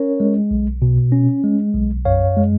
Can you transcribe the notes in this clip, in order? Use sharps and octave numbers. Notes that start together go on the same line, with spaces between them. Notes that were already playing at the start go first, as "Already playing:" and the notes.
Already playing: C#4 A#4 C#5
G#3
B1
B2
C#4
G#3
B1
F#2 C#5 F5
G#3